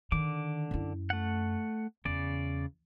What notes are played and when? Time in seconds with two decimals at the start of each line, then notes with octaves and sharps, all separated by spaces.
0.12 D3 D#3 D6
0.71 F#2 E4
1.10 A3 F#5
2.05 E2 C#3 D5